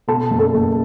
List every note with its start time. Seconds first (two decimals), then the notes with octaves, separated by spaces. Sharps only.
0.08 B2 A4 A5
0.31 F#1
0.39 A4 A5
0.54 F#1